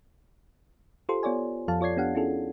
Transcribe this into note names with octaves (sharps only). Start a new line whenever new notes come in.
F4 G4 A4 C5 C6
B3 F4 C#5 D5 G#5
F2 F3 A4 F5 A5
F4 C#5 D5 G#6 C7
B3 D4 G4 F5 F#5
C#4 E4 F4 G#4 A4